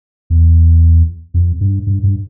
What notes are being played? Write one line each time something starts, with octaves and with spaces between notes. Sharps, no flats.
E2
F2
G2
G2
G2